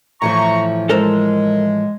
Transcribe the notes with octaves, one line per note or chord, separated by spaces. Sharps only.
A2 E3 F3 A#5 C#6
G#3 A4 A#4 C5